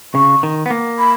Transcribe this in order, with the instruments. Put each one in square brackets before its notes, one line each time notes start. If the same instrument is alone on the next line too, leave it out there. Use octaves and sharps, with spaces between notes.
[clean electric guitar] C#3 [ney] C#6
[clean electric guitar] D#3
B3
A#3
[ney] B5